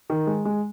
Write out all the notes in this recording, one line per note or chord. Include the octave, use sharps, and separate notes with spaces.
D#3
G#3
G#3